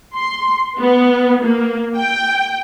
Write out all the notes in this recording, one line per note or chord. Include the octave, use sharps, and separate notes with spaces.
C6
B3
A#3
G5